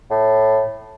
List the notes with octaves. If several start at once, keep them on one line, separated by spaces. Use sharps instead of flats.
A2